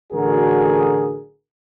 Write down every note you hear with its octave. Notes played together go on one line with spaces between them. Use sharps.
A1 D3 F#3 F#4 G#4 A#4